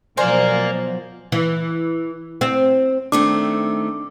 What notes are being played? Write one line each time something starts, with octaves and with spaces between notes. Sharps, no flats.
B2 F3 F#3 A#4 C5 D5 F5 G#5
E3
C4
D#3 A3 C4 D4 D6